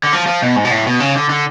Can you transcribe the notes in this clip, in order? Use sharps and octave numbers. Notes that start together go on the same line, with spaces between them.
D3
F3
F3
B2
G#2
B2
A2
B2
C#3
D3
D3